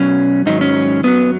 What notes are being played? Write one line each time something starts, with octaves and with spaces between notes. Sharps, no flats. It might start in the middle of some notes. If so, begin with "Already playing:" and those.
Already playing: B2 F#3 C#4
G#2 D#3 F#3 D#4
C#4
F#2 F#3 B3